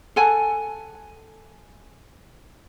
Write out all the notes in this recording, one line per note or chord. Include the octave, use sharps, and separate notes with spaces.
A4 F#5 G#5 A5